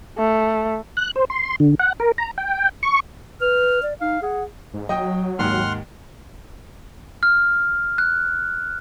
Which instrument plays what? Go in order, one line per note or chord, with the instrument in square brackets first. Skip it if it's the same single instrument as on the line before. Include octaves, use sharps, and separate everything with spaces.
[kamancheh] A3
[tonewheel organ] F#6
C5
C6
D3
F#5
A#4
A#5
G5
C#6
[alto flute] B4 [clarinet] F6
[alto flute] D5
[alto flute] D#4 [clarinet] F5
[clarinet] G#4 [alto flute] F#5
[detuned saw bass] G#2
[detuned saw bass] F#3 [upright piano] D#5 G5 D#6
[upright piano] D#2 G#2 D#3 [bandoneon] F#5 C6 F6
[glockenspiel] F6
F#6